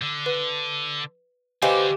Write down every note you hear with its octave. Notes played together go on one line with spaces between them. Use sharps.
D3
B4
D3 F#4 G4 B4 C5 D#5 F5 G#5